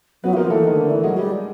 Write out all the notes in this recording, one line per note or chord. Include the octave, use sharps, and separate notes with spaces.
F#3 B3 B4
E3
F3 A#3 A#4
E3 A3 A4
D#3
D3
E3
F#3 G#3 G#4
G3